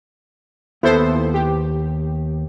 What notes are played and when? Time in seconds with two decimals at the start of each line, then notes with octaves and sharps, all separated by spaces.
0.83 D#2 B3 E4 A4 C5
1.34 G4